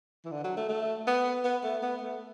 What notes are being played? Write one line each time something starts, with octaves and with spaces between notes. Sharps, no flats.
E3
D3
F#3
A3
A3
B3
B3
A3
B3
A3